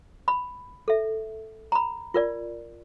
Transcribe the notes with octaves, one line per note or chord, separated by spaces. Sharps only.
B5
A4 E5
A#5 B5
F4 A#4 D5